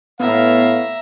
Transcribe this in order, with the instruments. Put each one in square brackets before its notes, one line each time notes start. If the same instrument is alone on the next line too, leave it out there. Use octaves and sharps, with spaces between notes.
[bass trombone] A2 [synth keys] B3 [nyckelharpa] E5 A#5 [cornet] F5